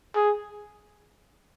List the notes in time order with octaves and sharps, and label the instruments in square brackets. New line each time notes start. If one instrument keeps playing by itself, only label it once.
[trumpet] G#4